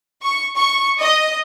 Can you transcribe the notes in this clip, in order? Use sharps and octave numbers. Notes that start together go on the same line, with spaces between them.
C#6
C#6
D#5